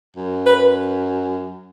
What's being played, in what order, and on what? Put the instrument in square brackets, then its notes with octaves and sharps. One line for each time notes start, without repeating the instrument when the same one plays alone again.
[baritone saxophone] F#2
[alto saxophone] B4